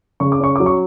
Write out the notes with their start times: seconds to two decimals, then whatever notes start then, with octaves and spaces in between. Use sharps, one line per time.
0.20 C#3 C#6
0.32 D6
0.40 C#4 C#6
0.56 F#3 D6
0.66 C#6